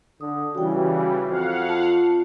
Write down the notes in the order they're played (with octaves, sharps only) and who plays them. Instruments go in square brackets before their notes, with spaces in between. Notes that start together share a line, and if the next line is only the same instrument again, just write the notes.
[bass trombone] D3 [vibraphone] D#6
[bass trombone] C#3 [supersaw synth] E3 G3 [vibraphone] F#4 G5
[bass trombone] F2 [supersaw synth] F5 F#5
[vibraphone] F4 A5